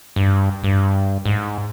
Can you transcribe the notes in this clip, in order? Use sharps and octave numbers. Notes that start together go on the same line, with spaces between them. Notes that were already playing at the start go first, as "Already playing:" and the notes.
G2
G2
G#2